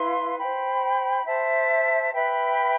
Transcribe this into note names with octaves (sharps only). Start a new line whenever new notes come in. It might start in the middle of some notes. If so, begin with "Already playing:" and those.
Already playing: E4 B4 F5 C6
C5 G5 B5
C5 E5 A5
B4 E5 G5 B5